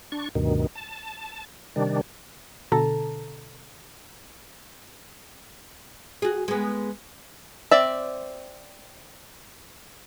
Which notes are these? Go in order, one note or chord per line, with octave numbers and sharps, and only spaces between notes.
D4 C#6
D2 G2 B2 D#3
A5
C3 D#3 G3 D4
B2 D3 A4 A5 A#5
F#4 G#4
G#3 B3
C4 D5 E5